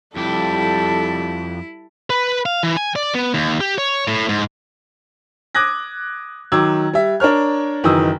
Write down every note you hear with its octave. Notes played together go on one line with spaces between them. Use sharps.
F2 G3 E4 G4 A4
B4
F5
E3
G#5
D5
B3
D#2
G4
C#5
A2
G#2
D6 D#6 F#6 G#6 A#6
D#3 F#3 D6 E6 G#6
G3 E5
D4 A#4 C#5 F6
F#1 D#3 E3 F#3 D#6 E6